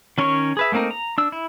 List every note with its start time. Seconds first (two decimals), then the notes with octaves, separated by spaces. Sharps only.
0.18 D#3 C#4 A#4 C#5 C#6
0.57 G#4 B4 E5
0.72 A3 A#3 C4 D#4 A#4
0.91 A#5
1.18 D4 E6
1.32 E4